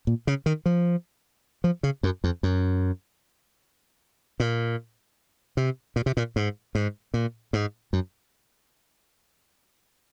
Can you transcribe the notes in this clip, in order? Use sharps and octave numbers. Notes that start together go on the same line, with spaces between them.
A#2
C#3
D#3
F3
F3
C#3
F#2
F2
F#2
A#2
C3
A#2
C3
A#2
G#2
G#2
A#2
G#2
F#2